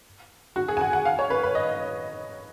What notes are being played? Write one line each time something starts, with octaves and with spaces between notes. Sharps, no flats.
F#4
G#4
G#5
F#5
F#5
F5
C#5
B4
B4
D#5